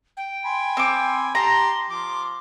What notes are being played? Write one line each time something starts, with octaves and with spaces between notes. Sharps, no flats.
G5
G#5 B5 C6
C4 D6
G4 A5 A#5 C6
F3 C6 D6